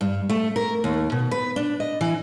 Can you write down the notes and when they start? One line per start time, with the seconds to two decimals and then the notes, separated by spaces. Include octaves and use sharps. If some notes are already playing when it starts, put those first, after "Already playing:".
0.01 G2
0.29 A3
0.56 A#4
0.84 D#2
1.12 B2
1.31 B4
1.56 D4
1.80 D#5
2.01 E3